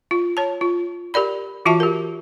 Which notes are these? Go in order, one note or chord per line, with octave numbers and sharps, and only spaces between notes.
F4
C#5 A5
F4
G4 A#4 D5 B5
E3 F4 F#4 E5 A5
G4 A#4